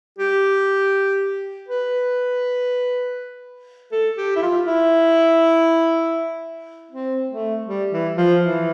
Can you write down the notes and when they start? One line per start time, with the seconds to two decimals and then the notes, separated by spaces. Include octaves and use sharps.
0.19 G4
1.69 B4
3.92 A4
4.17 G4
4.36 E4
4.42 F4
4.67 E4
6.91 C4
7.29 A3
7.67 G3
7.92 E3
8.16 F3
8.41 E3